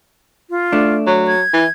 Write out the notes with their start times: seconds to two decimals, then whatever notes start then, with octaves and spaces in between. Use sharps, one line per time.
0.50 F4
0.72 A3 D4
1.07 F#3 C#5
1.27 G#6
1.53 E3